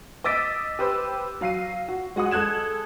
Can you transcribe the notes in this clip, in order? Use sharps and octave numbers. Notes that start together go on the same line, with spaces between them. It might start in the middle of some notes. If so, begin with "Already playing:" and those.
D#5 D6 E6 A6 B6 D7
G4 B4 C5 D6 E6
F#3 F5 C7 D#7
F#4
G#3 F#4 F#5 D#6
G#3 A4 F#6 G#6 E7